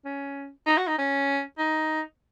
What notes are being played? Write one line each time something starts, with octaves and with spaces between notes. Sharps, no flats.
C#4
D#4
F#4
D#4
C#4
D#4